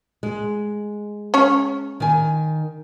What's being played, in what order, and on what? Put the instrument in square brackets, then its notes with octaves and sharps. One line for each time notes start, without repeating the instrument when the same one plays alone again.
[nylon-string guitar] G#3
[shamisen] C#4 C#5
[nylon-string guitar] D#3 G#5